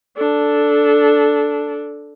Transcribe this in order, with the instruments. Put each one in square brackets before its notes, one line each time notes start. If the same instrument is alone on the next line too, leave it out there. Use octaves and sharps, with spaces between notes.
[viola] D4 A4